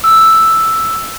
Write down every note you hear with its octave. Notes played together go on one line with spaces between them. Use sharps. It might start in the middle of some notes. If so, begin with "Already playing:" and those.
E6